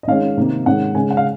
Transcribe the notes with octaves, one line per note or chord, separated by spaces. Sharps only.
D#5
D#3 G#3 C#4 F5
C3 D#3 A#3
G#2 D#3 G#3 C#4 F#5
C#3 G#3 C#4 G#5
F#5
F5